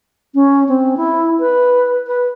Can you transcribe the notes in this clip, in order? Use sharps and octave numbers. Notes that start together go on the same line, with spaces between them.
C#4
C4
E4
B4
B4